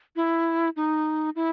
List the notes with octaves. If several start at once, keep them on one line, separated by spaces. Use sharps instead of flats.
E4
D#4
E4